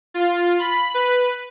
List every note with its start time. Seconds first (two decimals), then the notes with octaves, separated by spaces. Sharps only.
0.14 F4
0.60 B5
0.94 B4